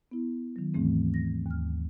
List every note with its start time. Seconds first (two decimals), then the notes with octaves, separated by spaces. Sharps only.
0.11 B3 E4
0.56 D#3 F#3
0.74 D#2 G#2 E3 A3 C4
1.14 A#6
1.46 D#2 F6